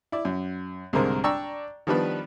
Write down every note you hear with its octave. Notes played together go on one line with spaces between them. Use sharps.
E4 D5
F#2
C2 G#2 D3 A#4 C5
D4 D5 G5 A#5 C#6 E6
D#3 F3 G3 B3 D4 B4